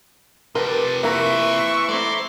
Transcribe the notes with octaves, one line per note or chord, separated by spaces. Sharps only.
C3 F3 G4 A#4 B4 A5
E3 A#3 A#4 E5 C#6
A3 C4 E4 D5 A#5 C6